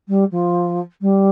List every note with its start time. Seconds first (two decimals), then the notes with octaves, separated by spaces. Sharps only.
0.08 G3
0.31 F3
1.01 G3